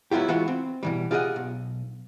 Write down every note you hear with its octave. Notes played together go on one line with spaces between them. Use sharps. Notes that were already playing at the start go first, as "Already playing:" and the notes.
F#3 B3 E4 F4 G4
E3 G#3 B3 F4 F#4
C4
B2 E3 G3
F4 G4 G#4 A#4 D#5 F#5
B1